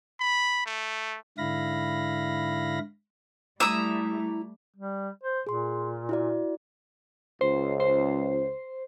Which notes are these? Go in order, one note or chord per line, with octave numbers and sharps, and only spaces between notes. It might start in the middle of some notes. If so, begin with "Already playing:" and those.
B5
A3
G#2 D3 E4 F5 B5 A#6
G3 A3 E4 A#5 D#6 E6
G3
C5
A#2 G#4 C6
E4 F#4 D5
C#2 C5
C5